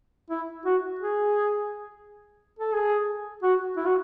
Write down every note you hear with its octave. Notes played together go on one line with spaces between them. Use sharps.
E4
F#4
G#4
A4
G#4
F#4
E4
F#4